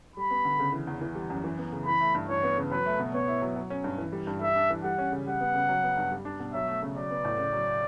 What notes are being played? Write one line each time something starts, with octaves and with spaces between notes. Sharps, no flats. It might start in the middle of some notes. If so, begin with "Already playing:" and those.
G3 B5
B3
D3
C#3
E3
E2
E3
G3
F#2
E3
B3
C#3
E3 B5
A3
G2
E3 C#5
B3
C#3
F#3 B4
A3
B2
B3 C#5
E4
F#3
F#3
C#4
G2
E3
G3
G2
G3 E5
D4
E3
G3 F#5
C#4
C#3
G3 F#5
B3
C#3
F#3
B3
G2
G3
D4
B2
F#3 E5
A3
C#3
F#3 D5
B3
A2
C#3
F#3